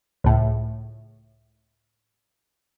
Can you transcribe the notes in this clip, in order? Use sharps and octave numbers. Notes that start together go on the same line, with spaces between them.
C#2 A2